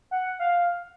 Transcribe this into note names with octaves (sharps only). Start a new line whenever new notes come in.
F#5
F5